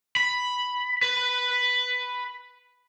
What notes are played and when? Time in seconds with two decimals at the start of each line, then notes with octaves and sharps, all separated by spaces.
0.17 B5
1.02 B4